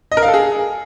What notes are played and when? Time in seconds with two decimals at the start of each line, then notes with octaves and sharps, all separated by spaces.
0.12 D#5
0.17 A#4
0.23 F5
0.28 A4
0.34 G#4